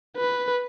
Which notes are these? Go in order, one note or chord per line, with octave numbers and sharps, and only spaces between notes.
B4